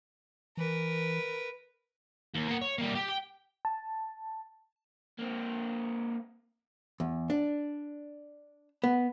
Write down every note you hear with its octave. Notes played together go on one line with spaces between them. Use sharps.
E3 A#4 B4
D#2
A#3 F#5
C#5
G3 A#3
G4
G5
A5
A#3 C4
E2
D4
B3